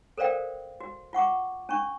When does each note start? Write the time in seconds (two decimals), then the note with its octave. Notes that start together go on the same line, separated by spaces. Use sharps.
0.18 A4 A#4 C5 D5 F5 G5
0.80 F#4
1.13 F4 F#5 C#6 D6
1.69 C#4 D4 C#6